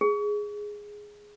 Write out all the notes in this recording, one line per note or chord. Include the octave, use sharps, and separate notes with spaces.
G#4